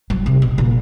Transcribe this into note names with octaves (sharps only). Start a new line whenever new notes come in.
F#3
C3
B2
A#2